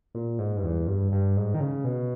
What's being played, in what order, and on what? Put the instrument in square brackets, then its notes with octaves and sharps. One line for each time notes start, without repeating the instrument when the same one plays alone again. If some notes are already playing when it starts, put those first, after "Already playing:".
[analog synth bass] A#2
G#2
G2
E2
G2
G2
G#2
D#3
C#3
B2